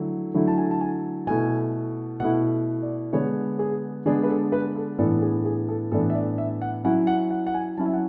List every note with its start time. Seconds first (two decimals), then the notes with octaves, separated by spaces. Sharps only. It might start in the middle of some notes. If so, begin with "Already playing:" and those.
Already playing: D3 F#3 A3 E4
0.34 D3 F#3 A3 E4
0.47 A5
0.58 G#5
0.71 A5
0.81 G#5
1.27 B2 A3 E4 G#5
2.20 B2 A3 E4 F#5
2.82 D5
3.13 D3 G#3 B3 D4 C#5
3.59 G#4
4.06 D3 G#3 B3 D4 G#4
4.23 B4
4.29 A4
4.52 B4
4.76 A4
4.98 A2 E3 B3 D4 A4
5.22 G#4
5.45 G#4
5.69 A4
5.92 A2 E3 B3 D4 A4
6.10 E5
6.15 D5
6.38 E5
6.62 F#5
6.84 F#3 C#4 E4 F#5
7.07 F#5
7.31 F#5
7.47 F#5
7.54 G#5
7.77 F#3 C#4 E4 A5
7.86 E5
7.93 F#5